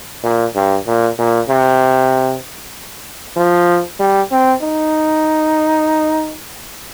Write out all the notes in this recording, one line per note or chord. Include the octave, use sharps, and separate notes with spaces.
A#2
G2
A#2
A#2
C3
F3
G3
C4
D#4